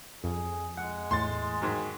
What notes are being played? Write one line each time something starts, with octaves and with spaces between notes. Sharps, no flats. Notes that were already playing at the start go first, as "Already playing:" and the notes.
F2 G#4
G#3 F#5
E2 A2 C6 A6
G#2 D#3 F#3